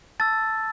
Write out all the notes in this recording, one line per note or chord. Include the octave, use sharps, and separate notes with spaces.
A5 E6 A6